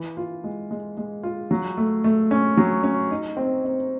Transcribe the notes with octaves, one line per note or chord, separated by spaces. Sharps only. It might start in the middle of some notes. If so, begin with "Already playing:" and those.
Already playing: E3
F4
G#3
G#3
G#3
F4
F#3
A3
A3
C#4
F#3
C#4
D#4
C4
C4